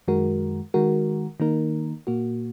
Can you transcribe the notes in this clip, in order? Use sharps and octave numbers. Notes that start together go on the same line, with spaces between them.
F#2 D#3 G#3 F#4 A#4
D#3 G#3 F#4 A#4
D#3 A#3 D#4 A#4
A#2 A#3 F#4